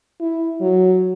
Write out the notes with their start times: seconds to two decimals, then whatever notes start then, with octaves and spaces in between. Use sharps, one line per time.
0.21 E4
0.61 F#3